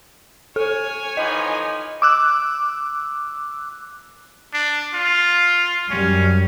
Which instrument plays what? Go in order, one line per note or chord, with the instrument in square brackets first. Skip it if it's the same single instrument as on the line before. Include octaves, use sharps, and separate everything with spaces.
[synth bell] A4 [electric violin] C#5 G#5
[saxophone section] E3 F3 D#4 [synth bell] D#5
[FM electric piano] D6 E6 F#6
[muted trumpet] D4
F4
[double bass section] F#2 G3 [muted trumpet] C#4